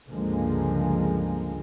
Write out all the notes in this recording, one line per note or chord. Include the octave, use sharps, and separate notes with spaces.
C#2 G2 D3 F3 G#3 A#3